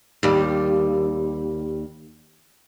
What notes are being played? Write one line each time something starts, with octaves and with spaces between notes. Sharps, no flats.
D#2 G3